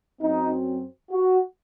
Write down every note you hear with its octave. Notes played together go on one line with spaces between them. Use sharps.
F#2 F#3 C4 D#4
F#4